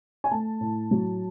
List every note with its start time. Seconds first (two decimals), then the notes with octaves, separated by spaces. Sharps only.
0.24 G#5
0.31 A3 A5
0.61 A2
0.91 F#3